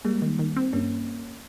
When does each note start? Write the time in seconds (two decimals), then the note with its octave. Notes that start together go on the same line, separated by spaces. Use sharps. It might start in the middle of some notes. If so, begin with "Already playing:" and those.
0.04 G3 G#3 A#3
0.22 D#3
0.39 D#3
0.56 C4
0.73 G2 A#3 C#4